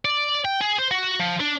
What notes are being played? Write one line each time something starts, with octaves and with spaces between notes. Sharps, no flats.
D5
G5
G#4
C5
F#4
F3
D4